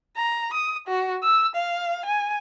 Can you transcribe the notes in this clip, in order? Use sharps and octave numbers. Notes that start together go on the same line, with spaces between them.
A#5
D#6
F#4
E6
F5
G#5